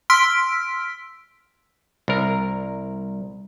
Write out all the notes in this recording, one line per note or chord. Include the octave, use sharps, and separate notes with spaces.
C6 E6 F6 B6 D7
C2 A#4